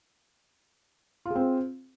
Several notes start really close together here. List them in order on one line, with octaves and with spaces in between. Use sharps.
F4 G#4 C4